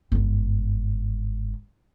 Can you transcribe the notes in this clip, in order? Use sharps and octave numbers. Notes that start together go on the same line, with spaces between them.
G1 G#2